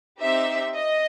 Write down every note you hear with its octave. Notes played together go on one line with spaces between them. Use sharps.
C4 D#4 G4 E5
D#5